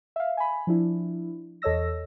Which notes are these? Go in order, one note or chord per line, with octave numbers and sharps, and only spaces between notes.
E5 F5
G#5 B5
F3 D4 E4
E2 A4 C#5 D#5 E6 A#6